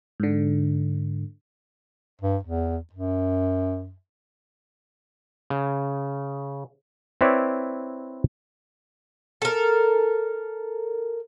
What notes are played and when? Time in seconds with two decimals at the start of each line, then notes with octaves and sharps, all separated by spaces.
0.20 G#2 D3
2.21 G2
2.43 E2
2.93 F#2
5.50 C#3
7.21 C4 E4 B4 C#5 D5
9.42 A4 A#4